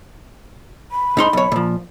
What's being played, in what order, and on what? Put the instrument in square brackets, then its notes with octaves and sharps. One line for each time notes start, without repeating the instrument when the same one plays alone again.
[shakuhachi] B5
[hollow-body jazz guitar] G#2 D#4 C6
B1 C#5
A#2 F3